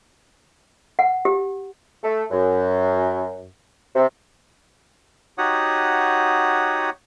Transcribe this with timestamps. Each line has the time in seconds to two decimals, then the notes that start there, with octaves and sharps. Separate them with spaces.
0.99 F#5
1.25 G4
2.03 A3
2.31 F#2
3.95 C3
5.38 D#4 F#4 G4 C#5 F#5 D#6